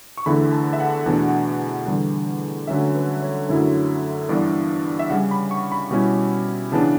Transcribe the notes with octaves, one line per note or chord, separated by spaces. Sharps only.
C#6
E2 D3 A3 E4 B5
A5
E5
F#5
E2 B2 A3 D4
E2 D3 G3
D3 F#3 A3 C#4 E5
B4
C#5
F#2 D3 F#3 A3 E4
G2 E3 B3 D4 D5
E5
C#3 G3 C#4 F#5
B5
C#6
B5
B2 G3 C#4 E4
C#3 E3 B3 D4 A5